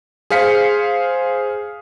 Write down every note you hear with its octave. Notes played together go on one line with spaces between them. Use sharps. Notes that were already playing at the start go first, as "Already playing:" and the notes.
G#4 C5 F5 B6 C#7